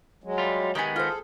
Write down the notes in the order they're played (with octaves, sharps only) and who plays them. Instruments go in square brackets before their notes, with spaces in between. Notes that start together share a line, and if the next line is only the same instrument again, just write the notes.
[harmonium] F#3 G#3
[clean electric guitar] G3 F4
[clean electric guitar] D#3 G#3 B3 [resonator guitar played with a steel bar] G4 G#5
[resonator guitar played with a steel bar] F4 C5 [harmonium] G#4 A4